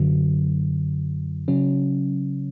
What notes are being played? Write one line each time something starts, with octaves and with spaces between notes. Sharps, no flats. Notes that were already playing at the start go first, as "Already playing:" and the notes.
Already playing: F#2 D3 F#3
C#3 F#3 C#4